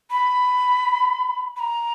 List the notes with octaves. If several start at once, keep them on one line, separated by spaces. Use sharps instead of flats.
B5
B5
A#5